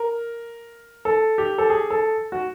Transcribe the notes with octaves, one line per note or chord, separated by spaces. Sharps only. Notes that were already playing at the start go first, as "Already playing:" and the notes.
Already playing: A#4
A4
G4
A4
G#4
A4
F#4